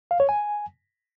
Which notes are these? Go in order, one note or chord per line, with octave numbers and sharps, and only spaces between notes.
F5
C#5
G#5